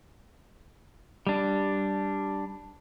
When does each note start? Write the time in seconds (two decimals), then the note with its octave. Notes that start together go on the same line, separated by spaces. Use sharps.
1.27 G3 D4